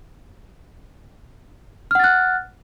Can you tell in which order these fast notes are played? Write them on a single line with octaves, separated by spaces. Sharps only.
F6 F#5 A6 F#6